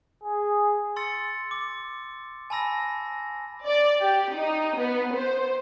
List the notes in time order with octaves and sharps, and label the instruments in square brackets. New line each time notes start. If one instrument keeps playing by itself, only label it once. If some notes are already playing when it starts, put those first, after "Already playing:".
[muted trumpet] G#4
[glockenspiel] C6 E6 A6 C#7
D6
G#5 A5 B5 E6 A#6
[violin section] D5
G4
D#4
B3
C5